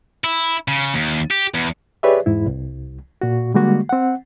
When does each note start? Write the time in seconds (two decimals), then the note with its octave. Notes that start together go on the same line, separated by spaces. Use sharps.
0.24 E4
0.68 C#3
0.94 D#2
1.31 G4
1.54 E2
2.03 G4 G#4 B4 C#5 D5 E5
2.26 E2 G#2 E4
2.46 C2
3.21 A#2 F#4
3.54 D3 G3 G#3 A#3 F#4
3.89 C4 F#5